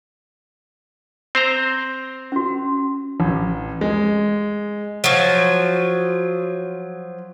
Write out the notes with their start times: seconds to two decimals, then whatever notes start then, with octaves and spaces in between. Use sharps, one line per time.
1.35 C4 C5 A#5
2.32 C#4 F#4
3.20 A1
3.81 G#3
5.04 F3 F#3